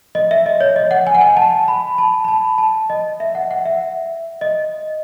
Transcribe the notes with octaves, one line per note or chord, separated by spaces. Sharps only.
D#5
E5
D#5
C#5
D#5
F#5
G#5
F#5
G#5
A5
B5
A5
B5
A5
A5
D#5
E5
F#5
F#5
E5
D#5